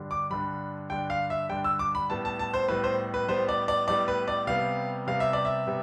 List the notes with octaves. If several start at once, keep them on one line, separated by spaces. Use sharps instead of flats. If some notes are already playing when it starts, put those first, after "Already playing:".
Already playing: G2 D3 G3
D6
G2 D3 G3 B5
G2 D3 G3 G5
F5
E5
G2 D3 G3 G5
E6
D6
B5
A2 G3 B3 A5
A5
A5
C5
A2 G3 B3 B4
C5
B4
A2 G3 B3 C5
D5
D5
A2 G3 B3 D5
B4
D5
C3 G3 B3 F5
C3 G3 B3 F5
E5
D5
E5
C3 G3 B3